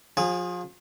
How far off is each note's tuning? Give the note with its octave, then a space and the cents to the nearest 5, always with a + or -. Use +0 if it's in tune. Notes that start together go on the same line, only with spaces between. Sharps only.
F3 +30 G#4 -25